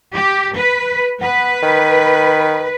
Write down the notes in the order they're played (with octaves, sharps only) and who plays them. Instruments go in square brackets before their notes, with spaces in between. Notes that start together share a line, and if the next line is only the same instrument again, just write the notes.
[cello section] G4
B4
[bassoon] B3 [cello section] B4
[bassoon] D#3